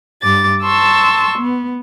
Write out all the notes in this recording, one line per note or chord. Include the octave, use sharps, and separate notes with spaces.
G2 D6 A6
A5 C6 C#6 E6
B3